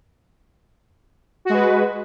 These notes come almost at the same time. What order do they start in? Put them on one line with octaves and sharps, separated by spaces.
F#4 G#3 B4